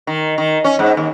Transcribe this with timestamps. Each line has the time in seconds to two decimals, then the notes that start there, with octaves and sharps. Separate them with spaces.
0.07 D#3
0.38 D#3
0.64 C#4
0.79 G#2
0.97 D#2